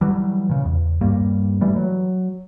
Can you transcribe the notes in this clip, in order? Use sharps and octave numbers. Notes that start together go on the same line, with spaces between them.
E3 F#3 G3
A#2 C#3
E2
D#1 G2 G3 A#3
E3 G3 A3
F#3